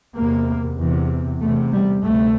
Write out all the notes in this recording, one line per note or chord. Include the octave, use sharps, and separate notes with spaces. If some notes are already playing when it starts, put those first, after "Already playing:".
E2 C3 A#3
E2 C3
E2 C3 A3
G3
D2 C3 A3